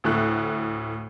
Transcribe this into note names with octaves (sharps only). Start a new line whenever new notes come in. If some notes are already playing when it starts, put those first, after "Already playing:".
D2 A2 F#6